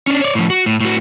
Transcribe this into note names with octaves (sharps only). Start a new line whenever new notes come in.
C#4 D4
C#5 D5
A2 F3
F#4
A2
A2 F#4